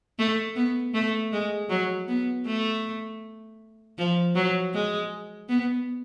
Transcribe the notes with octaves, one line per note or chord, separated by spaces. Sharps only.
A3
B3
A3
G#3
F#3
B3
A3
F3
F#3
G#3
B3